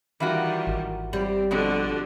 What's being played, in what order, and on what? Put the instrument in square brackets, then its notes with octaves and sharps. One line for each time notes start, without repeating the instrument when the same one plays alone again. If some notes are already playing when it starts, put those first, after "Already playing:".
[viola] D#3 G3 [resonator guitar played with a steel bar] E3 F4 F#4
[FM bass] G#1
[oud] G3 [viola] C4
[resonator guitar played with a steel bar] B2 F3 C4 [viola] D3 F#4